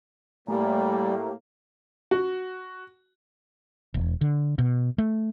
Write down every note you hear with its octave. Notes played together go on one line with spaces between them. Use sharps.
A2 G3 A3 A#3 G4 G#5 A#5
F#4
E1
D3
B2
A3